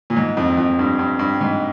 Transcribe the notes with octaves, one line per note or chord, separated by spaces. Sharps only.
A#2
G#2
F2
F2
G2
G2
G2
G#2